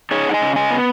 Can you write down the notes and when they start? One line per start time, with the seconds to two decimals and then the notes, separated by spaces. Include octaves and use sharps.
0.11 D#4 G#4 C#5
0.29 F#5
0.34 D#5 G#5
0.41 C#3
0.56 D#5 G#5
0.71 B3